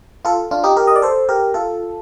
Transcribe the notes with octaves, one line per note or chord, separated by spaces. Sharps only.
F4 A4
D4 F4
D#4 G4
G4 A#4
D#5
D5
A4 C5
G4 A#4
F4 A4